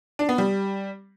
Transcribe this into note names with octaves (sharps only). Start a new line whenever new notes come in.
D4
B3
G3